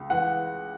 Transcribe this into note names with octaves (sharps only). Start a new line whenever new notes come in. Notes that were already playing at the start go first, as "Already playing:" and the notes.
Already playing: C#2
E3 F#5